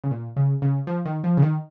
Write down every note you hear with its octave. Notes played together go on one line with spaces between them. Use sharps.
C#3
A#2
C#3
C#3
F3
D#3
F3
C#3
D#3